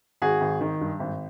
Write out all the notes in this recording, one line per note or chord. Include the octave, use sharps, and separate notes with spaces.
G#1 F#4 G#4
G#1
D#3
G2
G#1